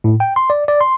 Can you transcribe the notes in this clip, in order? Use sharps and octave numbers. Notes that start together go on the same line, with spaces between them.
A2
G5
C6
D5
D5
C6